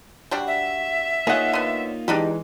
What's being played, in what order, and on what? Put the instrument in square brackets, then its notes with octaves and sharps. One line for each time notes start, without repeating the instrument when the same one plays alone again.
[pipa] G3 D4 F#4
[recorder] E5
[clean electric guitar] A#3 D#4 F4 [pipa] G#4 F#5 [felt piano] C#5
[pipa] D3 B3
[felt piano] E3 G#3 [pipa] D4 D#4 G4